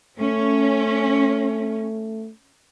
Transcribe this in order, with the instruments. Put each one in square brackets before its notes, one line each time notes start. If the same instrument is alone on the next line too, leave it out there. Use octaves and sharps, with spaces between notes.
[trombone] A3 [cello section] C#4